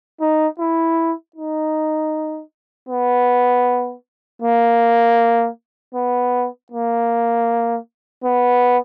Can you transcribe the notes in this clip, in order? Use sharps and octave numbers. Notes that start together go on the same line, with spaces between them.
D#4
E4
D#4
B3
A#3
B3
A#3
B3